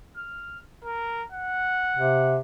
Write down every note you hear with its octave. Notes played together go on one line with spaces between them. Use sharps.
F6
A#4
F#5
C3